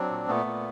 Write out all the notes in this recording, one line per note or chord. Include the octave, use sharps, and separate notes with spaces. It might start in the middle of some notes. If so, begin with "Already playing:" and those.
Already playing: F#3 C4 D4
A#2
A#2 A3 B3
A#2